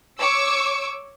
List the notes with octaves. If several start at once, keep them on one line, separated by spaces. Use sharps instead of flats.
C#5 C#6 D6 E6